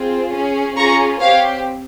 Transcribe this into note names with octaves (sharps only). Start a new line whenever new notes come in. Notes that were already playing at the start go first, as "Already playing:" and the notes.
Already playing: C4 F4 G#4
C#4 G#4
C#4 F4 G#4 A#5 C#6
C4 G4 C#5 F5